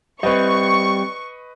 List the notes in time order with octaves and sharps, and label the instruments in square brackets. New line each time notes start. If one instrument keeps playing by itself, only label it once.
[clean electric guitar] G3 C4 [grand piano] B4 D#5 [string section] C#6